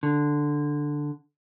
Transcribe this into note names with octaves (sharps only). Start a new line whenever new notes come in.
D3